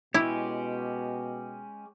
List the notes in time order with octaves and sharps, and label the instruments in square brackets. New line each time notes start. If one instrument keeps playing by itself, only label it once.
[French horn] B2 [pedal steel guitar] G#3 C#4 G4 [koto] E4